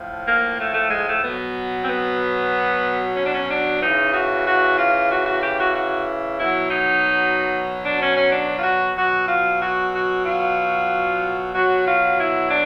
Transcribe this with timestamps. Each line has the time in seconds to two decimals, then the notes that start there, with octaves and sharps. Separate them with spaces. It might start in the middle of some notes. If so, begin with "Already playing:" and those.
Already playing: A2 F3
0.26 A#3
0.59 A3
0.74 A3
0.90 G#3
1.07 A3
1.23 B2 F#3 B3
1.82 C4
1.87 B3
3.16 C#4
3.25 D4
3.33 C#4
3.49 D4
3.80 C#3 E3 D#4
4.12 F#4
4.45 F#4
4.77 F4
5.09 F#4
5.25 F#4
5.41 G4
5.58 F#4
5.74 F#4
6.38 B2 F#3 E4
6.70 D#4
7.83 D4
7.99 C#4
8.16 C#4
8.31 D4
8.57 F4
8.63 F#4
8.95 B2 F#3 F#4
9.28 F4
9.60 F#4
9.93 F#4
10.25 F4
11.53 B2 F#3 F#4
11.85 F4
12.18 E4
12.49 D4